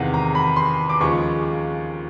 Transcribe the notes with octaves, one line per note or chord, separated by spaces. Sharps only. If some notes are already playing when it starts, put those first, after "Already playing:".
Already playing: E2 C3 D#3 G#3 F5 F#5
A#5
B5
C6
D6
D#2 C#3 F3 G#3 C#6